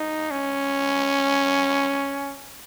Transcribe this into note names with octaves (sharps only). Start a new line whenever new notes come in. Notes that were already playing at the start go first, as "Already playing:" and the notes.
Already playing: D#4
C#4